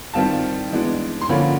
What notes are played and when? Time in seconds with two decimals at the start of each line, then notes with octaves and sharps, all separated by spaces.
0.14 D#3 G3 C4 F4 A5
0.72 E3 G#3 B3 D4
1.21 C6
1.29 D3 F3 A#3 C#4 B5